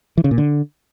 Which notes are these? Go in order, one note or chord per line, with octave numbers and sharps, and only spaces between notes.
E3
C#3
A#2
D3